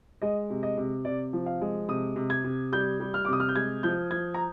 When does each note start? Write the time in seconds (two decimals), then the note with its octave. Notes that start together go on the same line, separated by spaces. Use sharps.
0.22 G#3 D#5
0.50 C3
0.63 D#5
0.78 C3
1.05 C3 D5
1.33 F3
1.46 F5
1.61 G#3
1.88 C3 D#6
2.16 C3
2.30 G#6
2.44 C3
2.72 G3 G6
3.00 G3
3.14 F6
3.25 D6
3.28 C3 D#6
3.40 F6
3.49 G6
3.56 G#3 G#6
3.83 F3 G6
4.11 F3 G#6
4.34 A#5